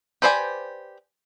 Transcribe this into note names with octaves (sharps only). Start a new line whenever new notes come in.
G4 B4 C5 D5 G#5